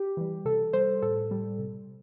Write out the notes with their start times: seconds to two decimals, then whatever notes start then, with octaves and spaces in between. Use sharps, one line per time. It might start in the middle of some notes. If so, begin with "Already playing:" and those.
Already playing: G4
0.17 E3 G3
0.45 C3 A4
0.73 G3 C5
1.02 A2 A4
1.31 G3
1.59 C3